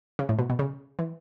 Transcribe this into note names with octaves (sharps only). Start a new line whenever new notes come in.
C#3
A2
B2
B2
C#3
E3